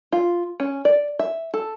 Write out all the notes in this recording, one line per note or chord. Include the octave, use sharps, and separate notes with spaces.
F4
C#4
D5
E5
A4